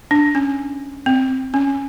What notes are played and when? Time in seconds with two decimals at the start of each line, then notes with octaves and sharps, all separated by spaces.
0.11 D4
0.35 C#4
1.06 C4
1.54 C#4